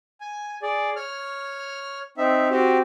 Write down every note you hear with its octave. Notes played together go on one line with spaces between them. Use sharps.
G#5
G#4 D5
C#5 F6
C4 D#4 E5
C4 F#4 G4